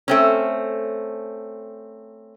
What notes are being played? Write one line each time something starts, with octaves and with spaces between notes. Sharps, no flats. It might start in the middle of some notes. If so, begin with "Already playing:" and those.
A3 C4 C#4